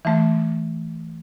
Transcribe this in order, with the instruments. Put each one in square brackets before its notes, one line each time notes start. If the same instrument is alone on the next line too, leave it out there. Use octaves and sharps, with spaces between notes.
[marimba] E3 A3